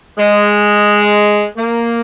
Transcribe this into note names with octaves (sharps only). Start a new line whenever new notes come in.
G#3
A#3